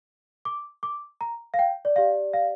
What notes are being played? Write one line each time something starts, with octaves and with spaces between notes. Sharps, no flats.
D6
D6
A#5
F5
G5
D5
G4 D5 F5
F5